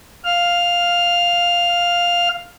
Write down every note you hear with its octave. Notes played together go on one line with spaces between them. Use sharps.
F5 F6